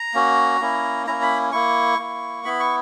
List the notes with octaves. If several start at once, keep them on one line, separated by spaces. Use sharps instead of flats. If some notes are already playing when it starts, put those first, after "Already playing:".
Already playing: A#5
A#3 C#4 F#4
A#3 C#4 E4
A#3 C#4 E4 A#5
B5
A#3 E4 C#6
A#3 E4
B3 E4 B5
C#6